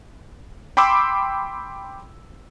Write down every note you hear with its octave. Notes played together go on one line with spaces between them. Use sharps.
G5 B5 C6 D6 E6